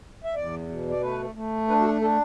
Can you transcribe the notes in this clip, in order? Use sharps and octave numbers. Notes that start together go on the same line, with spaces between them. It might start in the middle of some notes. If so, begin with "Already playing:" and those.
E5
E2 D5
B2
D5
A3 B4
A3
D4 B4
F#4
A4
D4 A4